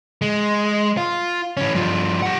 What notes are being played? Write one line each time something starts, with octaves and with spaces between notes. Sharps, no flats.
G#3
F4
E3 C#4
G2 F3
G4 F#5